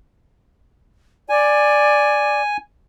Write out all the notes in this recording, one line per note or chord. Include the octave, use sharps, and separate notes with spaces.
D5 G#5